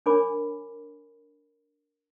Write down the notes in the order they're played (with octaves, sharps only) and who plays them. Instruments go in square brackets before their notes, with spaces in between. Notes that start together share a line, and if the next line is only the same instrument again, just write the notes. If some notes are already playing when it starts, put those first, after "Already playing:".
[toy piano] D4 A#4 C#5 G#5 B5 D6